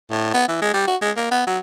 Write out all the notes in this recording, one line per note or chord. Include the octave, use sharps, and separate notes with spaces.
A2
B3
E3
G#3
G3
F#4
G#3
A#3
B3
F#3